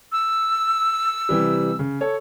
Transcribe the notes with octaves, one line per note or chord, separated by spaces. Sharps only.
E6
C3 E3 G3
C#3
A4 C#5